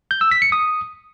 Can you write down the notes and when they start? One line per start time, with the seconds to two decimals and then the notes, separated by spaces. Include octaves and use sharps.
0.11 G6
0.21 E6
0.31 B6
0.42 C#7
0.52 D#6